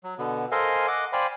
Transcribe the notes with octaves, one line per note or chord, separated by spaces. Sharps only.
F#3
B2 D3 B3
A4 A#4 C5 D#5 F5 G#5
D#5 F#5 D6
C5 D5 F5 G5 G#5 B5